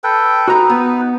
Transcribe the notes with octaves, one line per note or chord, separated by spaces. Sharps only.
A4 B4 G5
D#4 F#4 B4 A#5
B3